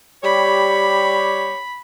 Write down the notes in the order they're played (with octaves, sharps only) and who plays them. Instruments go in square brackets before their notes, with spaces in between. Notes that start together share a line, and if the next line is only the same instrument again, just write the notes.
[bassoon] G3 [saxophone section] G4 C#5 [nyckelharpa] B5